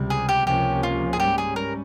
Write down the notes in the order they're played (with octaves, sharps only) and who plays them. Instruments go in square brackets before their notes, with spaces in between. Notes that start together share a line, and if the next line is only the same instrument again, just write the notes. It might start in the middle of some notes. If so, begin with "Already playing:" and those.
Already playing: [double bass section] C#2 C3 G3
[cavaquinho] G#4
G4
[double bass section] C#2 C3 F3 A#3 C#4 [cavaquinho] G4
[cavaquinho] F4
G#4
[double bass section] G#2 G3 C#4 [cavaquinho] G4
[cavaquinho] G#4
A#4